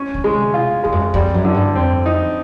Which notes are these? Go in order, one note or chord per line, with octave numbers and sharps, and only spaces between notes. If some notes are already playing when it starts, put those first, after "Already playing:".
Already playing: C#4
D3
G#3
C3
B2 F4
E2 G#3
F#2
F2
F2 G3
F#2
D3
G2
F2 C4
D#4